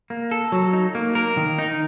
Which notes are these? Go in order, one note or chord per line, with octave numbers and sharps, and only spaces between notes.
A#3
A4
F#3
D#4
A#3
A#4
D#3
D#4